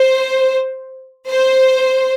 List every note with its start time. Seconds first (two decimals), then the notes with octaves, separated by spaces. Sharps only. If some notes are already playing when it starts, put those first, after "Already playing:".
Already playing: C5
1.30 C5